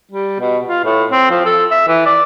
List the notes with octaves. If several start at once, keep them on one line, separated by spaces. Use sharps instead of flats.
G3
B2
F4
A2
C4
F3
A4
E5
E3
D5